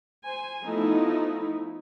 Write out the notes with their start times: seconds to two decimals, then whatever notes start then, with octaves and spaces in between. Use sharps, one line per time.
0.24 C5 G#5
0.63 F3 A3 B3 D#4 E4